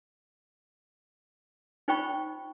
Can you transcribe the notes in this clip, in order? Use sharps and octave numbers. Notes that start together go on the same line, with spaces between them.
D#4 F4 C5 G5 B5 C#6